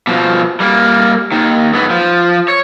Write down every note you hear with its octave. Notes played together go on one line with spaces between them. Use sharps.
B2 F3
G3 A#3
D#2 D#3
G#2 B3
F3
C#5